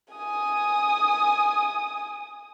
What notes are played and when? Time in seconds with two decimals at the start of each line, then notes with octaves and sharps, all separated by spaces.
0.13 G#5 D#6